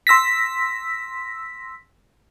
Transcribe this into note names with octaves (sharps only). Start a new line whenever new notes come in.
C6 E6 A#6 B6